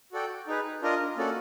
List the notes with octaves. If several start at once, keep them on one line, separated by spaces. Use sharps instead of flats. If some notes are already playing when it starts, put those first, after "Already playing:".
F#4 A4 D5 G5
D#4 G#4 B4
D4 F4 A#4 D#5
A#3 C#4 F#4 A4 D5